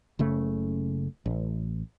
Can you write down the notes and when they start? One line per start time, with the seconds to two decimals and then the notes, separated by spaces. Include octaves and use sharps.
0.19 F#1 C#3 A3
1.26 A1